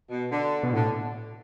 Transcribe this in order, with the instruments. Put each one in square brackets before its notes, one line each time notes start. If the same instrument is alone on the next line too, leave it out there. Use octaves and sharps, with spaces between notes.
[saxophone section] B2
D3
[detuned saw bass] B2
[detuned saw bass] A2 [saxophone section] D3